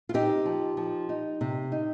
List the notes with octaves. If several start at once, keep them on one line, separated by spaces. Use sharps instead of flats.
F4
C4 D#4 G4
F3
F3
D#4
C3
D#4